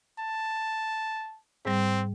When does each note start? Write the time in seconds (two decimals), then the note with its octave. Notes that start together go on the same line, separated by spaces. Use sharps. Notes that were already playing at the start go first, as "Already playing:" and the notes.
0.19 A5
1.65 G#2 G3 C4